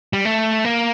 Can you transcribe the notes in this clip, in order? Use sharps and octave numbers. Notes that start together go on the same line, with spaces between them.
G3
A3
A#3